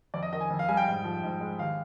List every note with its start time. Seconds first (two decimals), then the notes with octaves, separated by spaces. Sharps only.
0.14 F2 D5
0.23 D#5
0.33 D#3 D#5
0.41 G#5
0.50 F2
0.59 F5
0.68 G3 G#5
0.77 G5
0.87 G#2
1.04 F3
1.23 G#2
1.40 G#3
1.59 D#2 F5